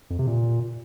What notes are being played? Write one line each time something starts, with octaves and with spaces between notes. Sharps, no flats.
F2
C3
A#2